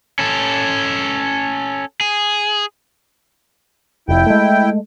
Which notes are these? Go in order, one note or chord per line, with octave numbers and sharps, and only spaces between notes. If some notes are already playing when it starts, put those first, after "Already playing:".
C#4 A4
G#4
F1 F2 E4 G5
G#3 A3